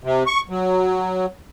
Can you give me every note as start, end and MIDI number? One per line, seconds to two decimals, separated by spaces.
0.04 0.23 48
0.26 0.41 85
0.49 1.26 54